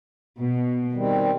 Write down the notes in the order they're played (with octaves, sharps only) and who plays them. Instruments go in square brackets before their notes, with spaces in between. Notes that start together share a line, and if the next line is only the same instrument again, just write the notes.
[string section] B2
[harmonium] D#3 G3 C4